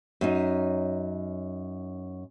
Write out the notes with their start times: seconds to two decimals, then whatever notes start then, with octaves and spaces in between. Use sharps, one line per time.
0.21 F#2 C#4 D#4